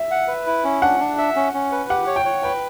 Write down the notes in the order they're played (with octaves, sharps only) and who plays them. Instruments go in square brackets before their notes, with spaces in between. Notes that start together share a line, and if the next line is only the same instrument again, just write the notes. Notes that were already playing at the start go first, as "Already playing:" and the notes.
Already playing: [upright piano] E5
[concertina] F#5
B4
E4
C#4
[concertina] D4 [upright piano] F#5
[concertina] D4
E5
C#4
C#4
B4
[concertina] G4 [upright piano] F#5
[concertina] C#5
[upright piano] G5
[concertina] C#5
[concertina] B4 [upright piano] G5